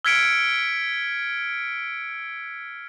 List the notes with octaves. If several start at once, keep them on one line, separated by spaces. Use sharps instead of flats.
E6 F6 G#6 B6 C#7 D7